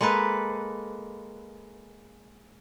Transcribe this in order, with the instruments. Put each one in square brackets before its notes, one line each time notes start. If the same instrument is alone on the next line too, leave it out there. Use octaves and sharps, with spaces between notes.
[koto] G#3 A#3 A4 B4